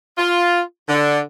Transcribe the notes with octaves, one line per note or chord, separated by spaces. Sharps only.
F4
D3